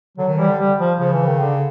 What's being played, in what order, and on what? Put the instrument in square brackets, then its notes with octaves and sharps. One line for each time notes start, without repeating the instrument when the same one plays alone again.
[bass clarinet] D3 [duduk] F#3
[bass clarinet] D#3
[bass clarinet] E3 [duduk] G3
[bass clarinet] D3
[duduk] G3
F3
[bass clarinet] C#3 [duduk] F3
[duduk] E3
D#3
D3